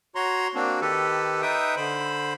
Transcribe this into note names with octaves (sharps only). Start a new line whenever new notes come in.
F#4 C#5 A#5 C6
A#3 C4 D4 F#4
D#3 G4 A4 B4
D#4 B4 E5 G5 D#6
D3 C5 B5